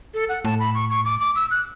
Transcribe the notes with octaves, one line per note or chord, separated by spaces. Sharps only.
A4
F#5
A2 A5
B5
C#6
C#6
D6
D6
E6
F#6